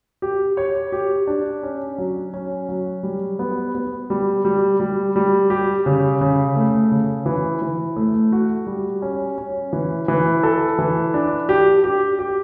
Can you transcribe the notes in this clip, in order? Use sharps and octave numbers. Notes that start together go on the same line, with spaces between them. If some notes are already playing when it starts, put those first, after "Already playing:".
G4
C#5
G4
D4
C#4
F#3
C#4
F#3
G3
B3
B3
G3
G3
G3
G3
G4
C#3
C#3
A3
C#3
E3
E3
A3
F#4
G3
C#4
C#4
E3
E3
A4
E3
D4
G4
G4
G4